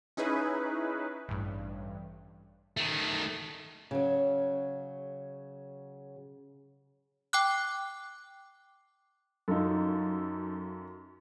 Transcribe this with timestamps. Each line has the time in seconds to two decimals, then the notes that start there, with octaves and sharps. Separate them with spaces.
0.17 C#4 D#4 E4 G#4 B4
1.29 A1 G2
2.77 D#3 A3
3.91 C#3 F#3
7.33 G5 D6 F#6
9.48 F#2 D#4 F4 A4